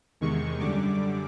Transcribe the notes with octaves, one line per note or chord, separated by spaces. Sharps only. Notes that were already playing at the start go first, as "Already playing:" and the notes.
E2 C3 D#3 G#3 C#6
F#2 D3 G3 D6